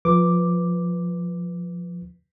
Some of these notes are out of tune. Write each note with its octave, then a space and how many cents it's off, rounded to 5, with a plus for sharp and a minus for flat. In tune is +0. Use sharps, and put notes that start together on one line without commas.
F3 +10 B4 +0 D6 +0